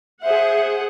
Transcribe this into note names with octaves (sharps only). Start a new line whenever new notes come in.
G#4 C5 E5 F#5